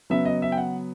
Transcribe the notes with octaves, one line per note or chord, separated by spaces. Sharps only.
C#3 F#3 B3 E5
D#5
E5
G5
F#5